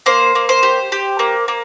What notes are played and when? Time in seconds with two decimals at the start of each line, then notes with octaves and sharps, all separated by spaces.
0.06 A#3 C5
0.35 A#3
0.49 C5
0.63 G4
0.92 G4
1.19 A#3
1.48 A#3